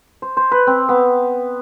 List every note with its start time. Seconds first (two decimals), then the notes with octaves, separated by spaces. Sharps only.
0.22 C5
0.37 C5
0.52 B4
0.67 C4
0.89 B3